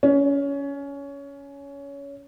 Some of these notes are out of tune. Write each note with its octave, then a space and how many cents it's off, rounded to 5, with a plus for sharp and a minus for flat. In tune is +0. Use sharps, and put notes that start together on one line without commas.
C#4 +20